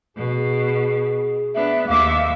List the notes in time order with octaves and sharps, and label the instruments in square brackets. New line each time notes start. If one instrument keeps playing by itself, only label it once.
[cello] B2 [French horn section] G#4
[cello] B3 D4 [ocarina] E5
[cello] D#2 E5 [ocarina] F5 [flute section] D6